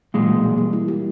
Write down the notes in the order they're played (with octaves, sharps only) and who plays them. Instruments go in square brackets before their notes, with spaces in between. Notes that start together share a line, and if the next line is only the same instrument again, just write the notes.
[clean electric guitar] B1 A#2 G#3 [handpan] E3
[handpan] G3
A#3
E4
G4